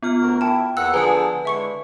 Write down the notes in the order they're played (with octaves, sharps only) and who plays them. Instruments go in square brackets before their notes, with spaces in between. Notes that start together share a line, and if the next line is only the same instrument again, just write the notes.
[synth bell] B3 F4 F6
[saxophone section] D2 F#4 A#4
[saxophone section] E4 [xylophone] G5 A5
[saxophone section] E2 A#3 F#5 [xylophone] E6 [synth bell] C#7
[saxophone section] D3 F3 G#4 [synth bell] B4 G#5 [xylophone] F#5 A#5
[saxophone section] D3 G#3 E4 [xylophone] E5 C#6 C#7